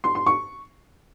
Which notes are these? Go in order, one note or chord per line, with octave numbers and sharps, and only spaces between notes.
C6
C6
C#6